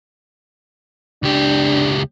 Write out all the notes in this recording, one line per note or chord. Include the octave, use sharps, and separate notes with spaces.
C#2 D4 G4